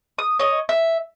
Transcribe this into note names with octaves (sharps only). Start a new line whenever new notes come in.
D#6
C#5 D#5
E5